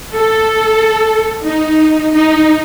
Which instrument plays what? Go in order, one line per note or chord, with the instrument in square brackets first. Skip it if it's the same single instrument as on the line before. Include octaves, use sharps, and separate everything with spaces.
[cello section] A4
D#4
D#4